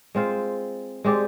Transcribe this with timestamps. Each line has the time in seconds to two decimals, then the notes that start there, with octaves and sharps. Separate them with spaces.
0.15 G#3 C4 F4 C5
1.04 G#3 C4 G4 D5